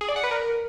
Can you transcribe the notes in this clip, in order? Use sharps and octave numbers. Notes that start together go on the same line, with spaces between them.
G#4
D5
F#5
B4
A#4